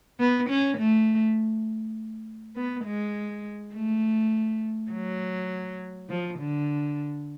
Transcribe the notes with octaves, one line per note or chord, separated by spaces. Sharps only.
B3
C#4
A3
B3
G#3
A3
F#3
F3
D3